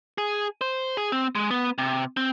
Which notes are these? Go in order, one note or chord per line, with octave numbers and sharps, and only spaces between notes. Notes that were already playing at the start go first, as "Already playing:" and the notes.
G#4
C5
G#4
C4
G#3
B3
C3
C4